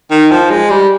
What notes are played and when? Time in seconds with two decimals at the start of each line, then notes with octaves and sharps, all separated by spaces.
0.11 D#3
0.31 F3
0.50 G#3
0.70 G3